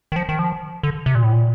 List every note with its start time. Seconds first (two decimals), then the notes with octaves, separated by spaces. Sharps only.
0.12 D#3
0.16 F3
0.29 D#3
0.39 F3
0.83 D3
1.06 C3
1.15 A#2
1.24 A2
1.33 A#2